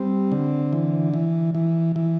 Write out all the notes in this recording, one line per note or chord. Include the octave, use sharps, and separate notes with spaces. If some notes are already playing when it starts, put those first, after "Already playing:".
Already playing: G3 C4
D3
E3
E3
E3
E3